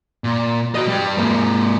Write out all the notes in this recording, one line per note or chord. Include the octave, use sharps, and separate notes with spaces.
A#2
F#4 D#5
G3 B4
G#2 A#3